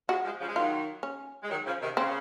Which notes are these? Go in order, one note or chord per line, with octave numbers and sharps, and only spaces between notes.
F3 G#3 F#4
F3 G#3
C#3 F3
G#3
D#3 F#3 F4
C#4
G#3
D#3 F#3
C#3 F3
C3 D#3
C#3 C4